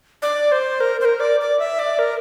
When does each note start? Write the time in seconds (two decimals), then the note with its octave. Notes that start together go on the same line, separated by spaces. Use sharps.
0.22 D5
0.52 C5
0.80 A#4
1.01 C5
1.05 A#4
1.20 D5
1.41 D5
1.59 E5
1.79 D5
1.99 A#4